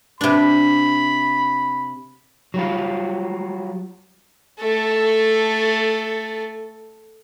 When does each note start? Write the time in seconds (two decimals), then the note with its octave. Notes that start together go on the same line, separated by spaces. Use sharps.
0.21 C3 D4 B5
2.54 F#3 G3 F4
4.59 A3 A4